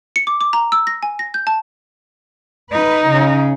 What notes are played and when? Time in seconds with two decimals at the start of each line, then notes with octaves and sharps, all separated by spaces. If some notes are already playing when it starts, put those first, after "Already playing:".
0.16 C#7
0.27 D6
0.41 D6
0.53 A#5
0.72 E6
0.87 A#6
1.03 G#5
1.19 A#6
1.34 G6
1.47 A5
2.72 D#4 B4
3.09 C#3